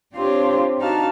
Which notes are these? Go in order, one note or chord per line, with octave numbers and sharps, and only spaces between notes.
C4 D4 F4 G4 C5 C#5
D4 D#4 F#4 F5 A5